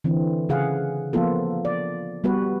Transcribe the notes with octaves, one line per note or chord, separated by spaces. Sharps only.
D3 E3 C4
C#3 G#4 F5 F#5
F3 A#3 B3 F4 A4
D5
G3 B3 F#4 B4